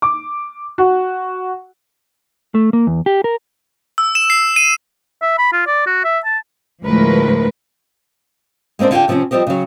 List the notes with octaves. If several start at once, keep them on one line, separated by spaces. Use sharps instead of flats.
D6
F#4
A3
A#3
E2
G4
A#4
E6
E7
C7
D#7
E5
B5
F4
D5
F#4
E5
A5
D2 A2 F3 G#3 A#4 B4
G#3 A#3 C4 D4 C5
D3 F4 G4 G5
C3 F3 A#3 C4 C#4
F3 G3 C4 G4 D#5
C#3 F#3